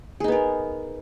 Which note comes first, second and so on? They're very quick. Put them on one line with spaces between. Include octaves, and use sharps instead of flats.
G#4 D#4 B3 A#4